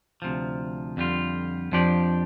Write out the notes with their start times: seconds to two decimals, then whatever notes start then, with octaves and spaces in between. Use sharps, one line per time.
0.22 D2 C3 F3
0.97 F2 D3 G3 F4
1.72 F2 F3 D4 G4 D5